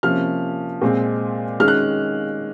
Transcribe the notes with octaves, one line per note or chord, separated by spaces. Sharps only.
C3 F3 A#3 C#4 F6
A#2 G#3 C4
D#3 G#3 C#4 F6
F#6